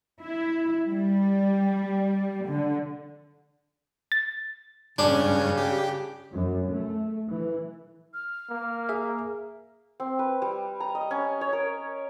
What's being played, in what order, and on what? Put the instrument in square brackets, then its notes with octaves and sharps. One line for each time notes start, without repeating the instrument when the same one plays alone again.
[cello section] E4
G3
D3
[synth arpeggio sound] A6
[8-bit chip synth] G2 C#4 [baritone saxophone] C#3 [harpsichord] D4
[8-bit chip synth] G4
[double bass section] F#2
A3
E3
[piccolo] F6
[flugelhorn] A#3
[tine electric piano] G#4 E5
[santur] C4
B4
G3
A#5
D#5
C#4
C#5
A#4